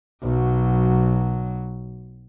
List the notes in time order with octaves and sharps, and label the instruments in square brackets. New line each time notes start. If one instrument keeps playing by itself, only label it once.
[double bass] B1 F#3